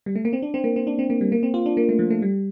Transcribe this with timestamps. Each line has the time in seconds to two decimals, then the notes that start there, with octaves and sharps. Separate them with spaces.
0.06 G3
0.16 A3
0.25 A#3
0.33 C4
0.43 D4
0.54 C4
0.64 A#3
0.76 C4
0.87 D4
0.99 C4
1.10 A#3
1.21 G3
1.32 A#3
1.43 C4
1.54 F4
1.66 D4
1.77 A#3
1.89 A3
1.99 F3
2.11 A3
2.22 G3